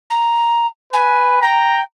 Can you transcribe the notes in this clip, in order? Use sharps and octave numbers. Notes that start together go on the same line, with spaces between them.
A#5
B4 G#5
G5 A#5